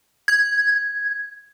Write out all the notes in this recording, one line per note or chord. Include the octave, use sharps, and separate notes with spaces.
G#6